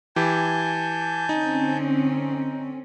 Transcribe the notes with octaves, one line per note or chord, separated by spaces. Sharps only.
E3 G4 G#5 A5 G6
D3 C4 C#4 D#4